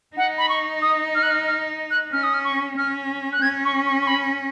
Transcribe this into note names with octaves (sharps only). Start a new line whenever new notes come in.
D#4 F#5
B5
C#6
D#6
F6
F#6
F6
F6
F#6
C#4 F6
D#6
F6
C#6
C#4 F6
F#6
C#4 G#6
C#6
C#6
C#6
B5